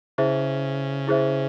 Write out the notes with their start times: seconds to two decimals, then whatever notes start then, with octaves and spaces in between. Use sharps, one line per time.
0.18 C#3 E4 G#4 C5 E5
1.08 E4 G#4 C5 E5